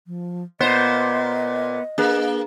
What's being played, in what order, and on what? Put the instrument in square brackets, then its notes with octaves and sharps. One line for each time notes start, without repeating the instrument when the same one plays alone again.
[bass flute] F3
[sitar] A#2 C5 [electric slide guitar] B3 [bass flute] D#5
[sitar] A#3 [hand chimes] D4 G#4 B4